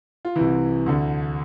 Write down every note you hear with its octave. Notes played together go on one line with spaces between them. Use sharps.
F4
C2 C3 E3 E4
D2 D3